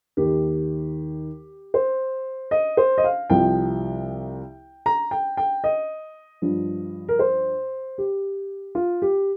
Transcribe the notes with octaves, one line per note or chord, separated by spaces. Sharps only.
D#2 D#3 G4
C5
D#5
C5
D#5
F5
C2 C3 F3 G5
A#5
G5
G5
D#5
G2 F3
A#4
C5
G4
F4
G4